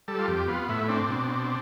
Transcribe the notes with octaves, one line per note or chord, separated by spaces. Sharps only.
G3 A4
F4
F2 G4
B3 F4
A2 E4
C4 D4
B2
C4